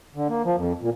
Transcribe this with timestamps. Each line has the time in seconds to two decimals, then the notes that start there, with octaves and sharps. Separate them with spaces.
0.15 D3
0.29 A#3
0.45 F3
0.57 F2
0.81 A#2